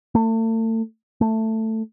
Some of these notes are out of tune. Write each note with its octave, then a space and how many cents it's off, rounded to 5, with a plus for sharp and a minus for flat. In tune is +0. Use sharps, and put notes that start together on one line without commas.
A3 +35
A3 +10